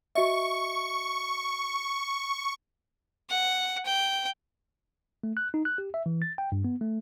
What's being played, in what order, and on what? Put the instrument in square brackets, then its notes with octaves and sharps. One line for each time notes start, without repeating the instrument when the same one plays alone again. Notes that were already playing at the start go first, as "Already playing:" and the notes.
[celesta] F#4 D#5 E5 [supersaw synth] C#6
[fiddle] F#5
G5
[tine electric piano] A3
F#6
D#4
F#6
G4
E5
E3
A6
G5
G2
B3
A3